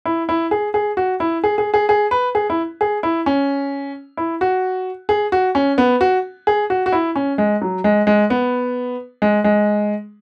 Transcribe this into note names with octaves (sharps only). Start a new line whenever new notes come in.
E4
E4
G#4
G#4
F#4
E4
G#4
G#4
G#4
G#4
B4
G#4
E4
G#4
E4
C#4
E4
F#4
G#4
F#4
C#4
B3
F#4
G#4
F#4
F#4
E4
C#4
G#3
F#3
G#3
G#3
B3
G#3
G#3